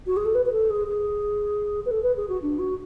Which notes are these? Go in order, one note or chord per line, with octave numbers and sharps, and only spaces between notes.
F#4
G#4
A4
B4
B4
A4
G#4
G#4
B4
A4
B4
G#4
F#4
D4
F#4